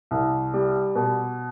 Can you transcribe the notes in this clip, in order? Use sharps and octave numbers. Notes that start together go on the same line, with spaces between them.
C2
G3
B2